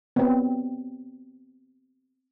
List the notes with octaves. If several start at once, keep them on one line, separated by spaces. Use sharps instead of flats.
B3 C4